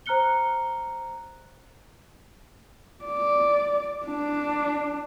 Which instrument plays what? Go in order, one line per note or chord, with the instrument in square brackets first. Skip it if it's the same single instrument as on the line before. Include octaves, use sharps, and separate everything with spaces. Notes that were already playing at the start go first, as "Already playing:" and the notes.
[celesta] C5 A#5 F6 F#6 C#7 G7
[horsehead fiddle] D5
D4